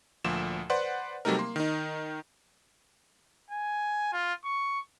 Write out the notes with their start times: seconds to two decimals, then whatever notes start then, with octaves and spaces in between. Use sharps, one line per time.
0.24 D2 A#2 F3 E7
0.70 B4 C5 D5 F#5 C6
1.25 C3 F#3 G3 A3 D#4 A#4
1.38 A#3 C6
1.56 D#3 D#4
3.50 G#5
4.12 F4
4.44 C#6